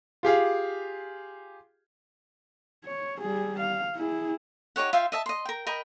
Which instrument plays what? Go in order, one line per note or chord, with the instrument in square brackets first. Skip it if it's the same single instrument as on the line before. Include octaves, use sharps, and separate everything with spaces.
[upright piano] F4 G4 G#4 F5
[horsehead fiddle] C#5
G3 G#4
F5
E4 G#4
[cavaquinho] D#4 G4 C#5 F#5
F4 E5 F5 G5
D#5 E5 A5
D#5 C6
A#4 G5
A#4 D#5 G5 B5